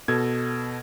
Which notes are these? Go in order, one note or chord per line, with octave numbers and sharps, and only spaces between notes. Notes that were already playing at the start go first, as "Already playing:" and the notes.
B2 A4 G#6